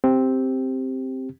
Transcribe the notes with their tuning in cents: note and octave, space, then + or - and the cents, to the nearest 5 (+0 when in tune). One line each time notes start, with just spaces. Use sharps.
C4 +0 G4 +0